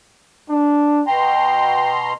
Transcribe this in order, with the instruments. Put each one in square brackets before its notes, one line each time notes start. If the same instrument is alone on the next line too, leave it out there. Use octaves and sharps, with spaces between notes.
[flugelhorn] D4
[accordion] B2 A#5 C6 [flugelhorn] G5